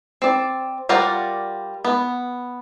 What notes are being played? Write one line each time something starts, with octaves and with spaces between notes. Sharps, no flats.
C4 D5
G3 F4 A#4 D5 F#5
B3